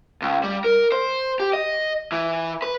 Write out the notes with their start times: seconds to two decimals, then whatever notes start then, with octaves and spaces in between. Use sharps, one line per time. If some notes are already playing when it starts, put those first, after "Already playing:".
0.22 C#2
0.44 G3
0.64 A#4
0.92 C5
1.40 G4
1.53 D#5
2.12 E3
2.62 B4